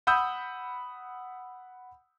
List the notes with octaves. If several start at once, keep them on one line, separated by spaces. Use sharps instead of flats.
F#5 B5 D#6 E6 G6